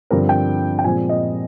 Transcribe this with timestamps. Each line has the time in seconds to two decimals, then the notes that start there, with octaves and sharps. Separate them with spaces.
0.11 G2 D3 F3 C4 A#4
0.29 G5
0.79 G5
0.84 A#2 F3 G#3 C4 G#5
1.09 D#5